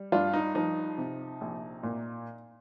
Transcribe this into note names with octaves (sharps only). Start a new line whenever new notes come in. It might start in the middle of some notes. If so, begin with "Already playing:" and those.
Already playing: G3
G2 D4 F4
D#4
F3 D#4
C3
A#1
A#2